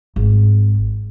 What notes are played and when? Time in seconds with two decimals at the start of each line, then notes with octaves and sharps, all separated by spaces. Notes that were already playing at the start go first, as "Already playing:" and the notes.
0.16 G#1